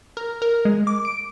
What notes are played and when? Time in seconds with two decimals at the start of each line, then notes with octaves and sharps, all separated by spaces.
0.17 A#4
0.42 A#4
0.65 G#3
0.87 D6
1.05 D7